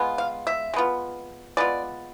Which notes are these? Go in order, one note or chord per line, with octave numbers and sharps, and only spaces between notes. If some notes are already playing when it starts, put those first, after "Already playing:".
Already playing: G#3 B3 F4
F5
E5
G#3 B3 F4
G#3 B3 F4 D5